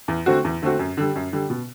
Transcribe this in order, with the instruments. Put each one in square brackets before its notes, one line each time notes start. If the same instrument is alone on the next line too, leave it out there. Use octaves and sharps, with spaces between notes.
[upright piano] E2
D3 A3 C4 F#4
E2
D3 A3 C4 F#4
F#2
D3 G3
F#2
D3 G3
B2